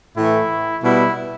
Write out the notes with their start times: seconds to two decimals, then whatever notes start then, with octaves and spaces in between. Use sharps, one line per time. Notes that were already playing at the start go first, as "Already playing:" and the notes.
0.17 A2 E3 A3 E4
0.83 B2 G3 B3 E4